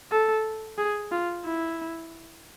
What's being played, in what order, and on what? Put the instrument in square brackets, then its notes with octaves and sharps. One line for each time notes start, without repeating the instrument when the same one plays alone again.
[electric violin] A4
G#4
F4
E4